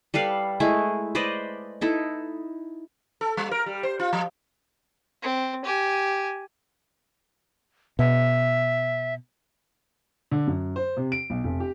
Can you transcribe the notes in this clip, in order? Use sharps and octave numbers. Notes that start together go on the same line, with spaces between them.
G3 A4 B4 F5
G#3 A3 E4
B4 C5 D5 D#5
D#4 E4 A4
A4
G3
A#4
G3
C5
F4
F3
C4
G4 G#5
B2 E5
D3
F#2
C5
C3
D7
B1
F1
G4